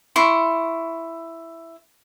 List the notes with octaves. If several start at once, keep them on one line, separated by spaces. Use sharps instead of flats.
E4 C6 C#6